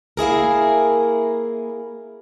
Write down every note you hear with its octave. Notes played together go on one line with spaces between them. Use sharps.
A#3 E4 G#4 A#4